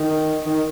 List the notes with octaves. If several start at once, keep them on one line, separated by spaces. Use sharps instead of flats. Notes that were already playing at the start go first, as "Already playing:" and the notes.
Already playing: D#3
D#3